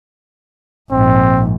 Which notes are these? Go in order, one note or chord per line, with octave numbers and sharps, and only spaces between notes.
A#1 G#2 C4